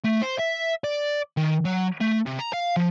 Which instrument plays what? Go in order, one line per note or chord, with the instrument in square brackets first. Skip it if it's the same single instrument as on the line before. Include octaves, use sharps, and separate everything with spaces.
[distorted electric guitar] A3
C5
E5
D5
D#3
F#3
A3
C3
A#5
F5
F3